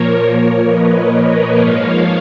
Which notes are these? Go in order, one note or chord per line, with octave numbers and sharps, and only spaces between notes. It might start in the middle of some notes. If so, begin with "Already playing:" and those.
Already playing: A#2 F3 A#3 A#4 C#5
A#4 C#5
B4 D#5
B4 D#5
G#2 F3 A#3 C#5 F5